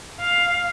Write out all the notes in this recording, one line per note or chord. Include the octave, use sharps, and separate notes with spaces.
F5